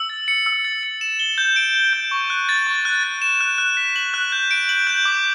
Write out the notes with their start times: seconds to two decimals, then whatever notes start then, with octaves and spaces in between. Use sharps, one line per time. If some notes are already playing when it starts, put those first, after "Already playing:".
Already playing: E6
0.09 A6
0.28 C#7
0.46 E6
0.65 A6
0.83 C#7
1.01 E7
1.19 G7
1.38 G6
1.56 D7
1.74 G7
1.93 G6
2.11 C#6
2.30 F#6
2.49 A6
2.67 C#6
2.85 F#6
3.03 A6
3.22 E7
3.41 F#6
3.58 F#6
3.77 B6
3.96 F#7
4.14 F#6
4.32 G6
4.51 D7
4.69 F#7
4.87 G6
5.05 D6